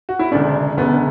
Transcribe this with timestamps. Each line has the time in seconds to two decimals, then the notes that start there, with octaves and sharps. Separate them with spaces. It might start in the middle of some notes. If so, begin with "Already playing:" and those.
0.09 F#4
0.19 E4
0.31 E1 D2 C#3 D4
0.77 E1 D2 C#3 B3